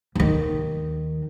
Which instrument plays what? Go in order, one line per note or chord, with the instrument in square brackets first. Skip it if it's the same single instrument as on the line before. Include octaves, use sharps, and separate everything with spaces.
[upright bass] D#2 D#3